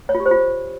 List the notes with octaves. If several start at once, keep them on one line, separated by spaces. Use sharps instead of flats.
C#5
F4
G4
C5
F4